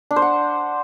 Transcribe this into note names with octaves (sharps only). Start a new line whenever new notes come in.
D4
C5
F#5